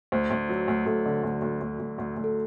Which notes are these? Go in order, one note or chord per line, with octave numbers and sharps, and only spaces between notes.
D2 C5
D2
F#3
D2
D2 A4
D3
D2
D2
D2
D2
D2
D2
A4